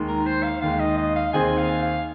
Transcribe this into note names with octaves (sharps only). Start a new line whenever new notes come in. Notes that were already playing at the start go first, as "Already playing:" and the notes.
Already playing: D#2 D#3 G#3
A#4
C5
F5
D#2 D#3 G#3 F5
D#5
D#5
F5
D#2 D#3 C4 G#4 C5 G#5
F5
F5